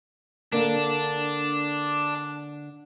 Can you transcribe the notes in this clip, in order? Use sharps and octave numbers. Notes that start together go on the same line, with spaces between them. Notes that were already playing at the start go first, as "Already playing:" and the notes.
D3 A#3 D4